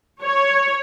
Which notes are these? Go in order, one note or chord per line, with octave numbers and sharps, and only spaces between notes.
C#5